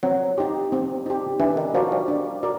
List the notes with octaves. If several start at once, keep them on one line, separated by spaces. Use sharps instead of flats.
F#3 C4
D#4 G4
C4
D#4 G4
E3 D4
D#3
F3 F#4 A#4 D5
G3
D4
F#4 A#4 D5